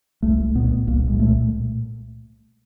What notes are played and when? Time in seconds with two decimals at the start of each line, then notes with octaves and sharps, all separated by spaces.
0.23 C2 A3
0.55 A#2 B3
0.87 C2 A#3
1.08 G#3
1.19 A#2 A3